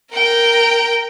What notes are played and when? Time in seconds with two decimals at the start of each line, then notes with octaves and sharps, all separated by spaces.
0.12 A#4 G5